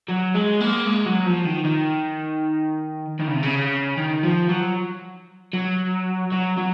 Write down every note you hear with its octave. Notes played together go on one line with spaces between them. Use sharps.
F#3
G#3
A#3
G#3
F#3
F3
D#3
D#3
D#3
C#3
C3
C#3
D#3
F3
F#3
F#3
F#3
F#3